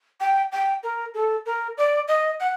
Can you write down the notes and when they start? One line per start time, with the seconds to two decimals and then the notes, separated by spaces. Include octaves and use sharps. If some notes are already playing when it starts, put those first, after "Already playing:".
0.20 G5
0.52 G5
0.83 A#4
1.14 A4
1.46 A#4
1.78 D5
2.08 D#5
2.40 F#5